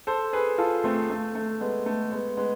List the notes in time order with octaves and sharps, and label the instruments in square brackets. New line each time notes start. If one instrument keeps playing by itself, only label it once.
[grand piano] A4 C5
G#4 B4
F4 A4
A3 C4
A3
A3
G#3 B3
A3
G#3 B3
G#3 B3